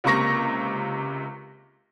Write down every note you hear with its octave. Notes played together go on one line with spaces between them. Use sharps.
C#2 C3 A#3 C#6 A#6